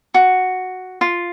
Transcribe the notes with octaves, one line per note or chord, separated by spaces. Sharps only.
F#4
F4